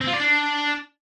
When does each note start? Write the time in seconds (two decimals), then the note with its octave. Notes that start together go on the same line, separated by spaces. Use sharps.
0.01 C4
0.07 F4
0.14 D5
0.20 D4